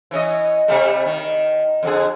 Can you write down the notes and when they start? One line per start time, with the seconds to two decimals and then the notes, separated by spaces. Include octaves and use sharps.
0.11 E3 C#4 D#5
0.68 C3 G3 A3
1.05 D#3
1.83 F2 D3 G#4